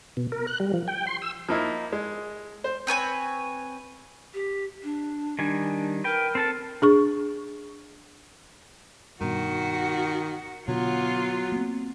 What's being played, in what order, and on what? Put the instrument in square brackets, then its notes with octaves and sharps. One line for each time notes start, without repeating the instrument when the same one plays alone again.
[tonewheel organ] B2
A#4
F#6
G3
F3
G5
C6
E6
[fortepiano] F3 A#3 D#4 E4
G#3
C5
[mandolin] C4 B4 C#5 G#5
[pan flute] G4
D4
[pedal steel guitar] D#3 G3 G#5 [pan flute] D4
[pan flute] A#4 [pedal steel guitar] B4 G5
[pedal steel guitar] C4 A4 A5
[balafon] D4 G#4 C#6
[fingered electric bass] G2 B2 [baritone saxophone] D#3 [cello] F#4
[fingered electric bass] B2 D3 [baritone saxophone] F#3 [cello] B3 F4
[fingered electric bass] A#3 C4